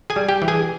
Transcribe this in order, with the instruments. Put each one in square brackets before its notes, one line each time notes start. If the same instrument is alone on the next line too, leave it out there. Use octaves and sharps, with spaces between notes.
[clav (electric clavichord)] G#4 G#5
G3
G4 G5
E3
G#4 G#5